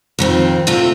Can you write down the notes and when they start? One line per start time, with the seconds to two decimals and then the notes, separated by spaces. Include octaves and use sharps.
0.19 F2 D#3 C4
0.67 C3 A3 C4 F4